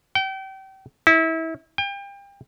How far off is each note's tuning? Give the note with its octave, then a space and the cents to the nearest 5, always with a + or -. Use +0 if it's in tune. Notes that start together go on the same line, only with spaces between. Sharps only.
G5 -30
E4 -30
G5 +35